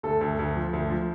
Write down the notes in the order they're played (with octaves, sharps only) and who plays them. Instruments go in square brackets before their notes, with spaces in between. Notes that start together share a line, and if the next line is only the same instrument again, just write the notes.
[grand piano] D2 A3 A4
D2
D2
F3
D2
F3